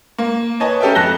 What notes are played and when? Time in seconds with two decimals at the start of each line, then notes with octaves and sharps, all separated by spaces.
0.18 A#3
0.60 B4 C#5 D#5 G#5 A5
0.81 C#4 G4 A4 A#4 E5 G5
0.95 F2 A5 F#6 A#6 G7